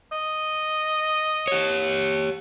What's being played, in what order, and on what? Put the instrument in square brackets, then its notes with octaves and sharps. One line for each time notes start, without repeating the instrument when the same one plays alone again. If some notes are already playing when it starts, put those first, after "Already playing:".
[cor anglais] D#5
[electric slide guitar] G4 C#5